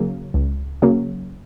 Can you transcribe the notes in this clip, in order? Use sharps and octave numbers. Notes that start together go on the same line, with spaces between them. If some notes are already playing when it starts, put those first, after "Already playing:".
Already playing: C#3 F#3 A#3
C#2
C#3 F#3 A#3